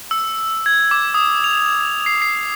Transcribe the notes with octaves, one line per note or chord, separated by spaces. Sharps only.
E6
G#6
D6
D#6
F7
C7
C7